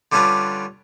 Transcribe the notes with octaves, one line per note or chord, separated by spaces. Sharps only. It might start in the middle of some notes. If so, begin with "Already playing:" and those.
D3 G3 C#4 D4 F4 B4